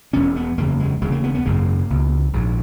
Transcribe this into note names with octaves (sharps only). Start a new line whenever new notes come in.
E1 E2 B2 C#4
B3
F#1 E2 C#3 A#3
G#3
E1 D#2 C#3 G#3
A#3
B3
B3
G#1 F#2 C#3 A#3
C#2 B2
A#1 G#2